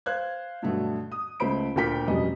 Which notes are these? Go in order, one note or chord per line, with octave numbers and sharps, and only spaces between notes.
C5 F5 F#6 G#6
G2 B2 D3 F#3 A3
D#6
C#2 A3 C5 B5 D7
D2 A#2 A#4 G5 B6
F1 F#2 B2 G3 D#5